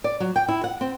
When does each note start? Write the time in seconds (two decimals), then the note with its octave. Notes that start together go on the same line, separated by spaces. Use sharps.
0.04 D5
0.20 F#3
0.36 G5
0.49 E4
0.64 F#5
0.81 C4